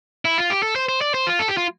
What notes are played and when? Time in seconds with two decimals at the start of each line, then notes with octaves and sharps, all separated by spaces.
0.25 E4
0.38 F4
0.50 G4
0.63 A4
0.76 C5
0.89 C5
1.01 D5
1.14 C5
1.27 F4
1.39 A4
1.48 G4
1.57 F4